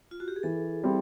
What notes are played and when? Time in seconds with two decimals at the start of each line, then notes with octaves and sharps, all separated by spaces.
0.11 F4
0.20 F#4
0.28 G4
0.36 G#4
0.43 E3 A4
0.83 G3 C4 E4